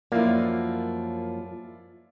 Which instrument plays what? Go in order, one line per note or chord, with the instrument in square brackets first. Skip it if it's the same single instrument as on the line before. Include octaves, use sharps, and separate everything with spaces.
[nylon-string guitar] F#2 F3 [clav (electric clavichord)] A#3 [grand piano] E4 F4 D5